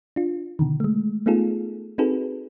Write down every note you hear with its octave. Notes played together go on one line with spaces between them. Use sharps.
D4 F4
B2 D3 D#3
G#3 A3
A3 B3 D#4 F4 G#4 A4
C4 D#4 F#4 G#4 A4 B4